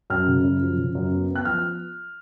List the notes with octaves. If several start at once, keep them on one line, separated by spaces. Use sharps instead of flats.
F#2 F6
C#3
F#2
F3
C#3
F#2
B3
B3
F#6
F3 F6